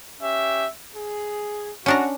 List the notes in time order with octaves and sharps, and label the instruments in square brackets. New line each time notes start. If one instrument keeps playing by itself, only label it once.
[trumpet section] C#4 G4 E5
G#4
[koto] C#4 D4 A#5 [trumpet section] F#4